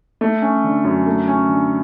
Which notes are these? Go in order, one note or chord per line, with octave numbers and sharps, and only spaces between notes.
A3
C#4
D3
F#2
A3
C#4
D3